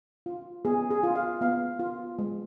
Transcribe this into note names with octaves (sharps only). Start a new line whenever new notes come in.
F4
B3 G#4
G#4
F4
F5
B3 F5
F4
G#3